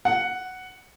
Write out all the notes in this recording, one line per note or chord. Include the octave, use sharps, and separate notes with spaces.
F#5